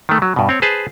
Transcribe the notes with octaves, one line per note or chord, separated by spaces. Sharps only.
D#3 A3
F#3
G2 B2
C4 C#5
G#4 B4 C5 A5